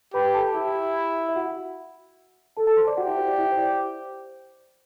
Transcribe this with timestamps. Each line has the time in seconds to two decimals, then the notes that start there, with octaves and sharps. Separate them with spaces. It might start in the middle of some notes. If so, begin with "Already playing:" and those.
0.14 G4 B4 B5
0.34 A4 A5
0.47 A5
0.55 E4 G4 G5
1.29 E5
1.36 F#4 F#5
2.57 A4 A5
2.67 A4 A5
2.77 C5 C6
2.87 D5 D6
2.97 F#4 G4 F#5
3.08 E4 E5
3.17 C5
3.28 D5
3.38 E4 E5
3.52 C5
3.58 D5
3.79 C5